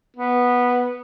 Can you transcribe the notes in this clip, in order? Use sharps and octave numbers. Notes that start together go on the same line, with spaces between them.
B3